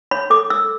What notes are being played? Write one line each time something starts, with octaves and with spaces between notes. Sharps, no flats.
C#5 B5
A4 D6
A4 E6